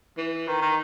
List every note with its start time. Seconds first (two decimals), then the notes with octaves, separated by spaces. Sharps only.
0.17 E3
0.48 D#3
0.62 D#3